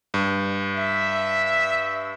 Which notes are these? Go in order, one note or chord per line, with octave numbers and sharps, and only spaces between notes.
G2
E5